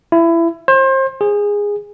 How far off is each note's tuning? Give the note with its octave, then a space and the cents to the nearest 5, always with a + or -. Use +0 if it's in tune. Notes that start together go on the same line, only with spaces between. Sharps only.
E4 +25
C5 +30
G#4 -15